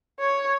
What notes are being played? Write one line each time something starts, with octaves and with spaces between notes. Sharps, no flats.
C#5